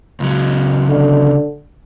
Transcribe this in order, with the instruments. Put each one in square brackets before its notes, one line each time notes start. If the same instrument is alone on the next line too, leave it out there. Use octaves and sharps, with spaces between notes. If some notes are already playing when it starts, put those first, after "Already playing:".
[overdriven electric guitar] C#2 F#3
[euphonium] D3